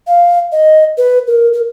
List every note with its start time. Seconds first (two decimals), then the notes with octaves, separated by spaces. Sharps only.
0.07 F5
0.52 D#5
0.97 B4
1.27 A#4
1.53 A#4